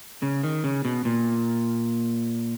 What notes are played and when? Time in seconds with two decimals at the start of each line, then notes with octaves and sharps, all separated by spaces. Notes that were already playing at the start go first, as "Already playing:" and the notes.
0.22 C#3
0.43 D#3
0.64 C#3
0.85 B2
1.05 A#2